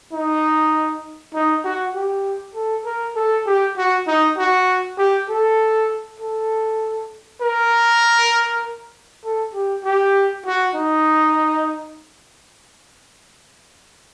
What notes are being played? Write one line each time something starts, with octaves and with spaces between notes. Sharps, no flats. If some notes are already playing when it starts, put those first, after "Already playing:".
D#4
D#4
F#4
G4
A4
A#4
A4
G4
F#4
D#4
F#4
G4
A4
A4
A#4
A4
G4
G4
F#4
D#4